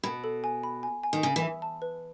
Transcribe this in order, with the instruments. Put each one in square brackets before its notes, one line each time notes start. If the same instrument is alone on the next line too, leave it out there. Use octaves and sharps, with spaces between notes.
[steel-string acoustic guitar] B2 [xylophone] B5
[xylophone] A4
G#5
B5
G#5
G#5
[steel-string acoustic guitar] D#3
[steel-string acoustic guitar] C#3 [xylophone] G#5
[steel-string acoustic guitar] E3
[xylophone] E5
A5
B4